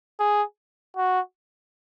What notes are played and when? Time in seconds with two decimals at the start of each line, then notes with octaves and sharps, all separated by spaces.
0.20 G#4
0.97 F#4